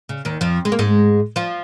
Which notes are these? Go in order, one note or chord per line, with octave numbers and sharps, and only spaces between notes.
C#3
D#2 D#3
F2 F3
G#3
A#3
G#2 G#3
F3 F4